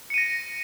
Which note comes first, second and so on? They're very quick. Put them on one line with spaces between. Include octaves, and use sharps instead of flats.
C#7 D#7 A#6